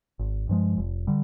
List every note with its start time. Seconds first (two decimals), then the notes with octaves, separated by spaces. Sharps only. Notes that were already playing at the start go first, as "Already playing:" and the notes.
0.19 G#1
0.49 G2 F3 G#3
0.78 F1
1.07 D3 G3